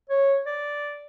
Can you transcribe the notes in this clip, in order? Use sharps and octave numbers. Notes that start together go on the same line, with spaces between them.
C#5
D5